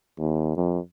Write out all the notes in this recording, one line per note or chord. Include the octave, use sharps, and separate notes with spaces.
D#2
F2